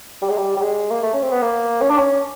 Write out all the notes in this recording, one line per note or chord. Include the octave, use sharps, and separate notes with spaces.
G3
G#3
G3
G3
G#3
A#3
A3
C#4
C4
B3
A#3
C#4
D4
C#4